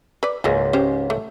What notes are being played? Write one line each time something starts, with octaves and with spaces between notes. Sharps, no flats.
B4 D5
C#2 G#2 F#3 G#3 A#3
C#4 G4 C5
A3